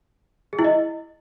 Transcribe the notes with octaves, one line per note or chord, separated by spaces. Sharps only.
G#4
E4
D#5